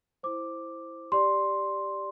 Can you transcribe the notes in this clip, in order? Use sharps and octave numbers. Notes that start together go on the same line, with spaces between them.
E4 C5 D6
G4 D5 C6